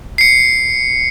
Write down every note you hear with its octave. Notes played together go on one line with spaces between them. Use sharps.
C7 C#7